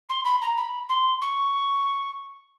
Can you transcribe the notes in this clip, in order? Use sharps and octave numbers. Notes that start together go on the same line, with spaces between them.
C6
B5
A#5
B5
C6
C#6